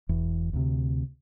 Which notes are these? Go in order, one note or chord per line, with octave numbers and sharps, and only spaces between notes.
E1 E2
D2 C3